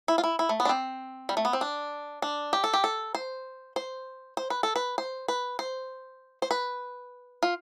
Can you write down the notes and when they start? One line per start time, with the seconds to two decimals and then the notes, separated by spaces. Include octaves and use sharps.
0.08 E4
0.18 F4
0.24 E4
0.39 E4
0.49 A3
0.60 B3
0.65 D4
0.69 C4
1.29 G3
1.37 A3
1.45 B3
1.53 C4
1.61 D4
2.22 D4
2.53 G4
2.64 A4
2.74 G4
2.84 A4
3.15 C5
3.76 C5
4.37 C5
4.50 B4
4.63 A4
4.76 B4
4.98 C5
5.28 B4
5.59 C5
6.42 C5
6.51 B4
7.43 F4